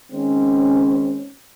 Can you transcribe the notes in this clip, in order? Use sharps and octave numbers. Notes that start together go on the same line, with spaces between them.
D#3 G#3 C4 C#4